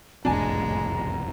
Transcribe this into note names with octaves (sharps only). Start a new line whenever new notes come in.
F#1 C2 F2 A2 G#3 D4 G#5 A#5